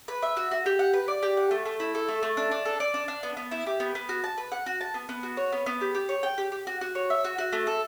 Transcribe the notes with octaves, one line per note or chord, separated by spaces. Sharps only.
B4
E5
F#4
F#4
G4
F#5
B4
D5
G4
F#5
A3
A3
E4
A4
A3
A3
D4
D4
A4
D5
D4
D4
B3
B3
E4
G4
B3
B3
F#4
A5
B4
F#5
F#4
A5
B3
B3
F#4
C#5
B3
B3
G4
G4
C#5
G5
G4
G4
F#4
F#4
C#5
E5
F#4
F#4
A3
A4